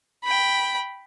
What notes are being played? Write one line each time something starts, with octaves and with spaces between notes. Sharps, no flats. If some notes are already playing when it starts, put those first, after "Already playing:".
G5 B5